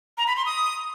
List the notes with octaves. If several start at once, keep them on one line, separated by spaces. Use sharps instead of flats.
A#5
B5
C6
D#6